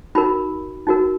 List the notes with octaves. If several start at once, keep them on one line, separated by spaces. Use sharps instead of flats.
D#4 F#4 A#4 B5
D#4 F#4 A#4